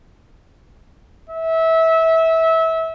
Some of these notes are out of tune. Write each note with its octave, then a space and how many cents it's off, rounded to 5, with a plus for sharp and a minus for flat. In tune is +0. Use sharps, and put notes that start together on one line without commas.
E5 -25